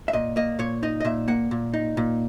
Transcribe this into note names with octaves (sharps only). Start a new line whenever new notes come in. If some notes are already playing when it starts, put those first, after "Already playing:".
E5
A#2 D#5
A#3 D#5
A#2 C#5
D#4 D#5
D#5
A#2 E5
A#3 F#5
A#2
D#4
A#2